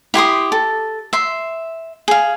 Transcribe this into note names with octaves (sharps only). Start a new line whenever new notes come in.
E4 G4 C6 D#6
A4
E5 C6
G#4 F5